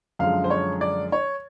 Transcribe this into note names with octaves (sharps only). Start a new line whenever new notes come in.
F#2 D3 F3 G#3 F5
C5
C#5
D5
C#5